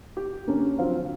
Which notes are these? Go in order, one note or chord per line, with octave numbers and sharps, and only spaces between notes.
G4
D3 A#3 C#4 D4
F3 F#3 C4 F5
D3